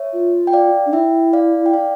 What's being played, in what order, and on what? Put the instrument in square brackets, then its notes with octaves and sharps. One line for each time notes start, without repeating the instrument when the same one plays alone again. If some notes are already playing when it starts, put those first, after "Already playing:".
Already playing: [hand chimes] C#5 E5
[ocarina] F4
[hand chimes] G5
D5 F5
[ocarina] D4
[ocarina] E4 [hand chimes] E5 G5
[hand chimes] D5 F5
G5
D5 F5